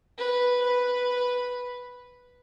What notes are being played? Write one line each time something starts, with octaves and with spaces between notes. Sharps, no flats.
B4
B4